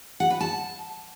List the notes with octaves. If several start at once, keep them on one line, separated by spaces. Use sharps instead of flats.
F#5
B4
A5